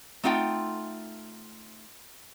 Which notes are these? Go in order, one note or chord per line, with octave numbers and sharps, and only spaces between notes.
A3 C4 D#4 F4 F#5 G5